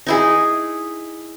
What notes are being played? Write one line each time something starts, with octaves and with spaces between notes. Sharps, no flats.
D#4 E4 G#4